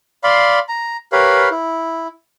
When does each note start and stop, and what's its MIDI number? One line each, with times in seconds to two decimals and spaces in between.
0.24 0.59 74
0.24 0.59 77
0.24 0.59 83
0.24 0.59 84
0.69 0.97 82
1.12 1.49 67
1.12 1.49 70
1.12 1.49 71
1.12 1.49 73
1.12 1.49 77
1.12 1.49 83
1.51 2.07 64